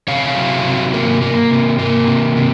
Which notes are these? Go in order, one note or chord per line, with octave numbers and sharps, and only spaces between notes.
C3 C#5 F5
F#3
C3
A#3
A#3
C3
A#3
C3
C3